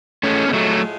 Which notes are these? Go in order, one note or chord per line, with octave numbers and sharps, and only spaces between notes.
A2 F3 G#3 A3 C#4
B3
F#3 A3